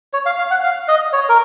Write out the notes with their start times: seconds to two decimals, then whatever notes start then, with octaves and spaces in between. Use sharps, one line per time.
0.13 C#5
0.26 F5
0.38 F5
0.51 F#5
0.63 F5
0.88 D#5
1.13 C#5
1.29 A#4